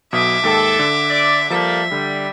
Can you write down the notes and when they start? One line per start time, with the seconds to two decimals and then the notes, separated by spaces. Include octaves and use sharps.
0.13 B1 B2 E5 D6 D#6
0.43 D#2 G#2 A4 G5
0.79 D3
1.10 D5
1.50 F3 G3 A#3 A4 E5
1.92 D3 G3